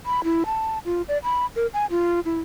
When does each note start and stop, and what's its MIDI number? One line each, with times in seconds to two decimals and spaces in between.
0.06 0.24 83
0.24 0.43 64
0.46 0.79 81
0.85 1.02 65
1.08 1.18 74
1.23 1.46 83
1.56 1.67 70
1.74 1.86 80
1.91 2.20 65
2.25 2.40 64